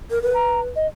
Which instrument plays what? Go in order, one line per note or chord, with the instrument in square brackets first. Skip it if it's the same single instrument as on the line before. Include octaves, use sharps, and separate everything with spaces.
[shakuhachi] A#4
[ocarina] A#4 [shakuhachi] B4
[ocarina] A#5
D#5